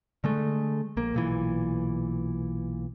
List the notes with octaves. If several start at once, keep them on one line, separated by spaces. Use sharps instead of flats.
D3 G#3 A3
A#1 A#3
B1 A#2 E3